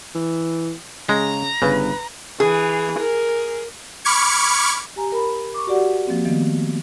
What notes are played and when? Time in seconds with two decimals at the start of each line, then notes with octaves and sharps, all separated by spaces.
0.15 E3
1.09 C#3 G#3 A#5
1.62 G1 C#3 B4
2.40 E3 G#4
2.97 A#4
4.05 B5 C#6 D6 F6 G#6 C#7
4.96 G4 G#5 A#5
5.12 A#4 B5
5.54 C#6 D6
5.67 F#4 G4 D5 F#5
6.07 F3 A#3 C4
6.25 D#3 F3 A3 B3